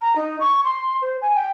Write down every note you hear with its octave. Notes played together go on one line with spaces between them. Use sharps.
A#5
D#4
C#6
C6
C5
G#5
G5